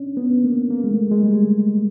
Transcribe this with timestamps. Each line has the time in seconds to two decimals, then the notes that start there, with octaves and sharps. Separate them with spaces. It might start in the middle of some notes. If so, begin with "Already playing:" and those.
Already playing: C#4 D4
0.17 B3
0.44 A#3
0.71 A#3
0.84 G#3
0.91 A3
1.11 G#3
1.23 G3